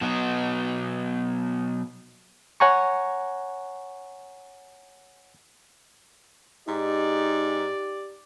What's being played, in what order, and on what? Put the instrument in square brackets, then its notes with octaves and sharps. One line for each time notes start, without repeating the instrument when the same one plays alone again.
[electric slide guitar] B2 F#3 B3 D#4
[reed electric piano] C#5 F#5 G#5 A#5 C#6
[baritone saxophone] G#2 [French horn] D#4 [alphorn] G4 [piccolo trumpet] D5